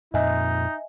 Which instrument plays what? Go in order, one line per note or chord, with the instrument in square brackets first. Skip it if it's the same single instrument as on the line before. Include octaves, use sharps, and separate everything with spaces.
[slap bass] F2 A#2 [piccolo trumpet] D#4 [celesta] D#5 E5 G#5